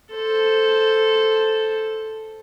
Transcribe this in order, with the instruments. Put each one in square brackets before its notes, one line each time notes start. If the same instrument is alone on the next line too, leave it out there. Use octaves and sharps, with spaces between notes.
[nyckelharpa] A4 C5